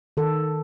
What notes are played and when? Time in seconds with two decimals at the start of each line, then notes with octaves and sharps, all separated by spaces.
0.17 D#3 A4